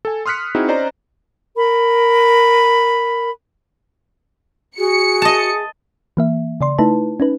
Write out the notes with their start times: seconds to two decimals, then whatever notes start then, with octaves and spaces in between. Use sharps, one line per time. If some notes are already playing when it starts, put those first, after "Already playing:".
0.05 A4 G#5
0.26 C6 D#6 F6 F#6 B6 C#7
0.55 C4 D#4 E4 F#4 G#4
0.68 C#4 C5 D5 D#5 A#5
1.57 A#4 B5
4.78 F#4 G#4 C#7
5.22 D#5 A5
6.17 E3 A#3 E5
6.61 C#3 D5 C6
6.78 A3 D#4 E4 B4 A5
7.20 C#4 D#4 B4